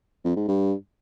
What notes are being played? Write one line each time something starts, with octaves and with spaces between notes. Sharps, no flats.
F2
G#2
G2